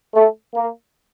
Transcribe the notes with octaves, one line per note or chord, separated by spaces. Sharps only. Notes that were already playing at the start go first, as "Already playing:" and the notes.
A3
A#3